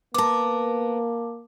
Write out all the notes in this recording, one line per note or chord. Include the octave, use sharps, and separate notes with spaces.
A#3 B3 A#4 A5 D6